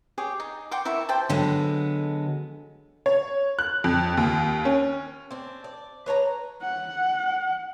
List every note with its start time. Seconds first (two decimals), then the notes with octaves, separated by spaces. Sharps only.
0.18 G4 G#4 C#5
0.40 D#4
0.71 F#5 G5 C6 D6
0.85 E4 A#4 E5 C#6
1.09 G4 C5 G5 A5
1.29 D3 F#3 G#3 B3
3.06 C#5
3.59 F#6
3.84 F2
4.17 D#2
4.65 C#4
5.31 C4 D4
5.64 D5
6.06 B4 C#5 G#5 A#5
6.62 F#5